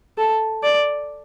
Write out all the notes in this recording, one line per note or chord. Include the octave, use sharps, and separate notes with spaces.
A4
D5